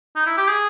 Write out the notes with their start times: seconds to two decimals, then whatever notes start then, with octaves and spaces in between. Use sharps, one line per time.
0.16 D#4
0.27 E4
0.37 G4
0.48 G#4